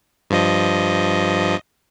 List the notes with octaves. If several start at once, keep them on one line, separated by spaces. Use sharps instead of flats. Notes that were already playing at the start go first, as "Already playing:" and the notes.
G2 F3 D#5